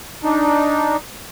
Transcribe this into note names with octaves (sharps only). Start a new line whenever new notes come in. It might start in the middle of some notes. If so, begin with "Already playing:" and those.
D4 D#4